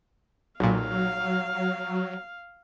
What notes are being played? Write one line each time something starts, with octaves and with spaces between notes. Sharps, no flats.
B1 A#2 F#3 F5